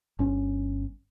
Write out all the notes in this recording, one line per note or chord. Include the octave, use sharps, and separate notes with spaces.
G1 C#4